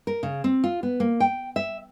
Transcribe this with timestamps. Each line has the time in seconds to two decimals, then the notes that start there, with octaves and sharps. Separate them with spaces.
0.07 A#4
0.23 C#3
0.44 C4
0.64 F4
0.83 B3
1.00 A#3
1.20 G5
1.56 E5